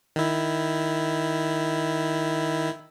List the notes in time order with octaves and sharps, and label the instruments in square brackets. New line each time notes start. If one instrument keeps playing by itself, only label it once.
[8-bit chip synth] D#3 E4